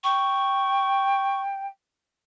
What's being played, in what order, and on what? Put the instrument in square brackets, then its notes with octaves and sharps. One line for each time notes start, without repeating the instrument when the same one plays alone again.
[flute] G5 [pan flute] C#6